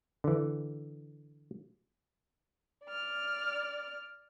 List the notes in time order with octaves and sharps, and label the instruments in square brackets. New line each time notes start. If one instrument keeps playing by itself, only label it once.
[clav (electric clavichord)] D3 E3
[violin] D5 F6